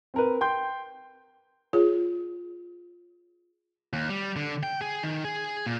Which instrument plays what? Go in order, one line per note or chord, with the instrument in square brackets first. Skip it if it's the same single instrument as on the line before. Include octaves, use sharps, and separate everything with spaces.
[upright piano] C4 A#4 B4
G5 C6 G6
[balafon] F4 G#4 C#5
[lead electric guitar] D#2
G3
D3
G5
G#4
D#3
G#4
A#2